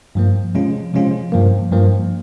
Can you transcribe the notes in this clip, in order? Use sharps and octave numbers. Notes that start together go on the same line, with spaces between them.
G2 F3 A#3
C3 F3 G#3 C#4 F4
C3 F3 G#3 C#4 F4
G2 F3 A#3
G2 F3 A#3